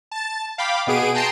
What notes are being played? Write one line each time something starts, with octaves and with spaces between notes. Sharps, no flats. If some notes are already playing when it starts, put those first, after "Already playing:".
A5 A6
F5 G5 B5 D6
B2 B3 G#4 D7 D#7
G5 A5 A#5 C6 C7 D7